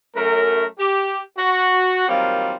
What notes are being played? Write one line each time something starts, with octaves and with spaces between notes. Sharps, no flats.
F#2 A3 A#4
G4
F#4
D#3 F#3 G3 A#3 C4 F4